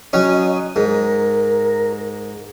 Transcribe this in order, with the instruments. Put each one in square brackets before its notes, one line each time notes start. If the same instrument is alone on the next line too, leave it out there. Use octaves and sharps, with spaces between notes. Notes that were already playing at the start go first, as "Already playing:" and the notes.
[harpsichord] F#3 C#4 [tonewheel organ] D#5
[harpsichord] G#2 [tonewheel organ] A#4